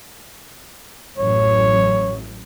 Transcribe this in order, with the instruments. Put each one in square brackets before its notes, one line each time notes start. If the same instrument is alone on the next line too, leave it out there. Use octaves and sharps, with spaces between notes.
[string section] A1 F#2 [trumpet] C#5